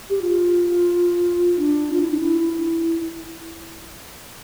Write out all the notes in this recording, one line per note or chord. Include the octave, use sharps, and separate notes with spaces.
G4
F4
D4
F4
E4
D4
E4